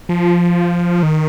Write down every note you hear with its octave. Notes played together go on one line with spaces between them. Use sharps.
F3
D#3